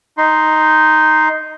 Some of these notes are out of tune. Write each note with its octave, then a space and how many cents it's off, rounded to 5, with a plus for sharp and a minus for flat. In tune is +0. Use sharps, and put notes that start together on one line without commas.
D#4 +0 C6 +0